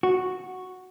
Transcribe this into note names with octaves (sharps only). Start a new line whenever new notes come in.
F#4